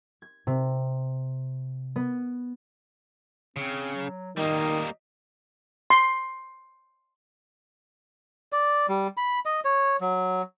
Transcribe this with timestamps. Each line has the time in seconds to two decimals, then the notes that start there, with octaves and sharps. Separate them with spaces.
0.22 G#6
0.47 C3
1.96 B3
3.56 C#3 C4
3.95 F#3
4.37 D#3 G3 A#3 D#5
5.90 C6
8.53 D5
8.89 G3
9.17 B5
9.46 D#5
9.65 C#5
10.01 F#3